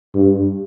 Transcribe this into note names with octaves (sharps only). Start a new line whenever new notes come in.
G2